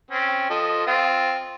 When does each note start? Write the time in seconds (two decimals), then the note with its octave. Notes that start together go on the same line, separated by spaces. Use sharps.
0.11 C4 C#4
0.50 F3 A4 D#5
0.87 C4 F4